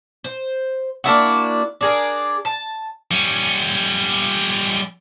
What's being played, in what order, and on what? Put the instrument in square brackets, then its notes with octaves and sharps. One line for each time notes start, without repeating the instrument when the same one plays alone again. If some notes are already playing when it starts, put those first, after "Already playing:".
[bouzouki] C5
A#3 D4 E4 F#4
D4 G#4 A#4
A5
[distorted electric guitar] G3 C#4